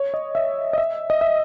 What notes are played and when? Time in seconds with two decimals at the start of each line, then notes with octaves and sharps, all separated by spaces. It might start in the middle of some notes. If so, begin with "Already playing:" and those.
Already playing: C#5
0.14 D#5
0.35 E5
0.73 D#5
0.78 E5
1.10 D#5
1.21 E5